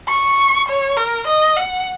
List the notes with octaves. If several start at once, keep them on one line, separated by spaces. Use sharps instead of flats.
C#6
C#5
A#4
D#5
F#5